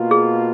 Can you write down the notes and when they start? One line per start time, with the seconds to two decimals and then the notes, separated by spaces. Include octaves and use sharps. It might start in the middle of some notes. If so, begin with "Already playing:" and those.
Already playing: B2 A#3 F4
0.11 G#4